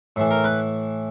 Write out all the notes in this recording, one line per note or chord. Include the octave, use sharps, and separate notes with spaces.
A2 E3
A#4
B4